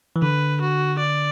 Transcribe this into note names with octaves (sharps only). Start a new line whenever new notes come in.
E3
D3 B4
F#4
D5